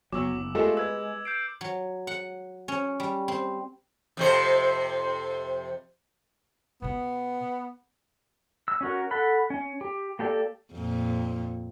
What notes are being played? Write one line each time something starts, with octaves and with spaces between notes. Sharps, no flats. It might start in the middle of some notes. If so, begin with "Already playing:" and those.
F#1 F#3 B3 C#6 D6 E6
F#1
G#3 A3 F4 G4 A4 A#4
B4 E6 G#6
G6 C7 D7
F#3
F#5
C#4
G3
C4
F2 C3 C5
B2 B3 C#4
E6
C#4 F#4 A#4
A4 F#5 B5
C#4
G4
A#3 G4 A4 D5
F2 A#2